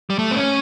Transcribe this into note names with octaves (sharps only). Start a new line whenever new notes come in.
G3
A3
C4
C#4